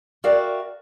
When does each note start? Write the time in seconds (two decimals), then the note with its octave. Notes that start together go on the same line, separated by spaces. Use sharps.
0.24 F#4 A#4 D5 E5 F5 G5